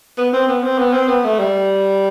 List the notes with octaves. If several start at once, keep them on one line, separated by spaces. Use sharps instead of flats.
B3
C4
B3
C4
B3
C4
B3
A3
G3